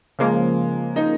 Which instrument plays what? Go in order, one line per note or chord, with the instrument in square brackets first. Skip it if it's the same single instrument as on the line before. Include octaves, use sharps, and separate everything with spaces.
[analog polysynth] C#3 F3 A#3 [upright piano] G#3
[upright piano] D#4